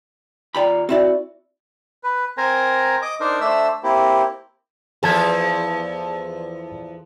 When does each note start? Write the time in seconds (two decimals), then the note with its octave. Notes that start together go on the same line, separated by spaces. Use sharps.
0.55 D#2 F4 D5 G5 A#5 B5
0.89 C4 E4 F#4 D5
2.03 B4
2.37 C4 A#4 C5 G#5 A#5
3.02 D#5 D6
3.20 D4 D#4 A#4 C5
3.41 A3 D4 C5 E5 E6
3.83 A#3 C4 E4 G4
5.03 E2 F3 G#4 A4 A5 G#6